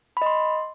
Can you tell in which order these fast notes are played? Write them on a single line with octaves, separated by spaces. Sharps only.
B5 D#5 C6